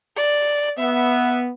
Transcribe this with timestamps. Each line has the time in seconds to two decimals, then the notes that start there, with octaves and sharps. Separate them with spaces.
0.17 D5
0.79 B3 E5